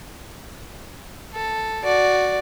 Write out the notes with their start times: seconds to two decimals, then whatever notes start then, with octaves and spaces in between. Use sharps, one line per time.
1.34 A4
1.84 F#4 D5